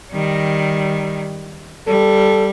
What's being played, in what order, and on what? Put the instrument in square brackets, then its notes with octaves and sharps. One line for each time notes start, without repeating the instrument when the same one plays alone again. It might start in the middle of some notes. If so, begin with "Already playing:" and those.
[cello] D#3 G3
[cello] G3 [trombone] A4